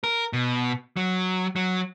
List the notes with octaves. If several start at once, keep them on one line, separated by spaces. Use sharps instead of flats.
A#4
B2
F#3
F#3